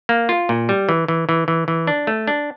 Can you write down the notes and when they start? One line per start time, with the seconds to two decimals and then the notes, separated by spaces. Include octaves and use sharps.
0.09 A#3
0.29 F4
0.49 A#2
0.69 G3
0.89 E3
1.08 E3
1.29 E3
1.48 E3
1.68 E3
1.87 D4
2.07 A3
2.27 D4